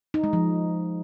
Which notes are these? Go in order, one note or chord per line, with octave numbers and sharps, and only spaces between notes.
D#4
G#3
F3